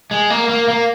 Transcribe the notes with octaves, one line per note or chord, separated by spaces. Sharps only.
G#3
A#3
A#3
A#3